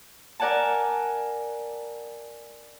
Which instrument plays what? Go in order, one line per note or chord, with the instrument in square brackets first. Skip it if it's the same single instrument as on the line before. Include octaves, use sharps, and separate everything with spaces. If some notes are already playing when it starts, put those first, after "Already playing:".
[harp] A#4 D5 F#5 G#5 A5